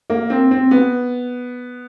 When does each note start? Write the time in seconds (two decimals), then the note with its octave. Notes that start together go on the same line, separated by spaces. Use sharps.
0.10 A#3
0.30 C4
0.51 C4
0.71 B3